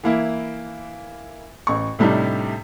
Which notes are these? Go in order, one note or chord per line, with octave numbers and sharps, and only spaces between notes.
E3 A#3 E4
A1 C#6
A2 C3 G3 D4 D#4